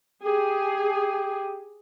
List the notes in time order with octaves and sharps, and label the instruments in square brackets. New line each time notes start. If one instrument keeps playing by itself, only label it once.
[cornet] G4 [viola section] G#4